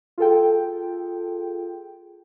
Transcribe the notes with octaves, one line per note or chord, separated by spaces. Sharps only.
F4 G#4 A4 G5